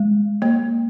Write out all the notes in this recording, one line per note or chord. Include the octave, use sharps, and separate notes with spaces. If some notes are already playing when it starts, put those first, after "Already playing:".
Already playing: G#3
A#3